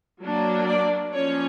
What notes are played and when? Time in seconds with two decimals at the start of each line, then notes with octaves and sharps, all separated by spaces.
0.21 F#3 A#3 D4
0.67 D5
1.12 F3 A#3 C#4 C#5